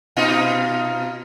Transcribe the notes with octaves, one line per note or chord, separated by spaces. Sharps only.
B2 D#4 F4